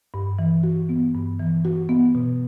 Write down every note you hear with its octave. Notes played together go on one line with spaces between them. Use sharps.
G2
E3
F#4
B3
G2
E3
F#4
B3
B2